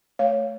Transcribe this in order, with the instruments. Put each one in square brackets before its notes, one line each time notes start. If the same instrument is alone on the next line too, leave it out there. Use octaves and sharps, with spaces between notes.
[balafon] A3 C#5 F5